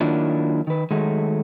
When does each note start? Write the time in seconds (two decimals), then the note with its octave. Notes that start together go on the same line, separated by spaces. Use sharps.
0.01 D#3 F#3 A#3 D4 E4 F4
0.67 D#3 B4
0.91 D#3 F#3 G#3 A3